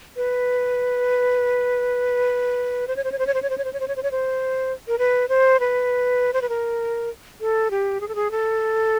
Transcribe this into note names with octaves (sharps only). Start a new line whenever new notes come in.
B4
C5
C#5
C5
C#5
C5
C#5
C5
C#5
C5
C#5
C5
C#5
C5
C#5
C5
C#5
C5
A#4
B4
C5
B4
C5
B4
A#4
A4
G4
G#4
A4
G#4
A4